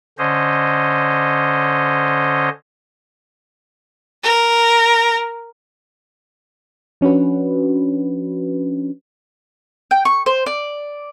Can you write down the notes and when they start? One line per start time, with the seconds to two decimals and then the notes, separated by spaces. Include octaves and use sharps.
0.18 D3 C#4 C5 D#5
4.23 A#4
7.01 F3 C#4 D4 F#4 B4
9.91 G5
10.05 C#6
10.26 C5
10.46 D5